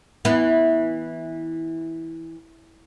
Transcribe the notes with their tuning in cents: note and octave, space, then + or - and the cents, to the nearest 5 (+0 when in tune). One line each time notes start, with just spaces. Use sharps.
E3 -15 B3 +0